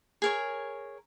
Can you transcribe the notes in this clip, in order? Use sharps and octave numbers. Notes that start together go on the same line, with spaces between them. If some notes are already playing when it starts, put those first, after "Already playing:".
G#4 A#4 C#5